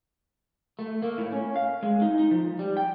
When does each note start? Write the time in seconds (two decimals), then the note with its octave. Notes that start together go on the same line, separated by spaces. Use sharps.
0.79 A3
1.02 A#3
1.18 A2
1.32 C#4
1.56 F5
1.83 G#3
2.01 D#4
2.19 D#4
2.31 F3
2.59 G3
2.77 G5